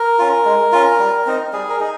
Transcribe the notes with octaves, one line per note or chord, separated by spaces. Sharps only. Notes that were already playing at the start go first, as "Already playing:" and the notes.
Already playing: A#4
C#4 F4
G#3
C#4 F4
G3
C4 D#4
G3 G#4
A#4
D#4 G#4